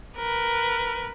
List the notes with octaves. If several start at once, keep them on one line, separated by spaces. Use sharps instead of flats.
A#4 B4